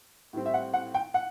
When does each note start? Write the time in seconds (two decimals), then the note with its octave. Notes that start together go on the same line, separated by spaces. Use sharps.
0.33 A2 G3 C4
0.46 E5
0.54 F#5
0.74 F#5
0.94 G5
1.14 F#5